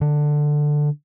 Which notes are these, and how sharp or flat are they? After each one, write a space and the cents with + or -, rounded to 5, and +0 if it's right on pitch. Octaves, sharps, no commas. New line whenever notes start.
D3 +10